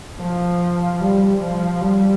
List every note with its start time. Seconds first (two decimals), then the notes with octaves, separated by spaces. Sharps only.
0.20 F3
1.00 G3
1.40 F3
1.80 G3